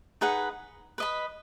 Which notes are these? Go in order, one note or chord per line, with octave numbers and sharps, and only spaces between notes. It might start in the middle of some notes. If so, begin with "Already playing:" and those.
D#4 G#4 B4 F#5
B4 D#5 B5